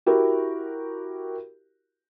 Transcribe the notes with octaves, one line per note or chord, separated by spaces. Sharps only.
E4 F#4 G4 A#4